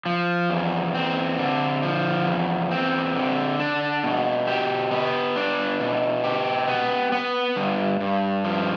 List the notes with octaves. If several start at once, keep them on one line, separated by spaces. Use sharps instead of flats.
F3
E2
C4
D3
F3
E2
C4
D3
D4
B2
G4
B3
D4
B2
G4
B3
B3
G2
G2
F3